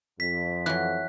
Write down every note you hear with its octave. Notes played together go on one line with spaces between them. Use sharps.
F2 B6
E3 F#3 F#6